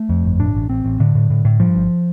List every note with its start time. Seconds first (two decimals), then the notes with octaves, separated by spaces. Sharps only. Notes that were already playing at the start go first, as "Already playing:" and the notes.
Already playing: A3
0.09 F2
0.24 G1
0.39 A2 D4
0.55 A1
0.69 A1 C4
0.84 A1
1.00 A2 D3
1.15 A2
1.30 A2
1.45 A2
1.60 G2 F3
1.75 G1